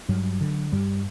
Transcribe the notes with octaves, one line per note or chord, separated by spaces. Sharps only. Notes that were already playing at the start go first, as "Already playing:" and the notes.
G2 F#3
D3
G2 G3